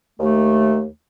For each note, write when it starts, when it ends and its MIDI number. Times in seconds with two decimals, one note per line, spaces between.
0.20 0.86 39
0.20 0.86 57